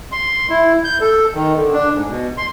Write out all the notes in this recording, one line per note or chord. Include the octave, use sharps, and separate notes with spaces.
C6
E4
G6
A4
D#3
D3
D4
G#2
B2
C6